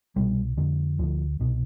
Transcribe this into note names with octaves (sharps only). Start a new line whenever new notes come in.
C2 B2 G3
F2 D3
D2 D3 F3
C2 B2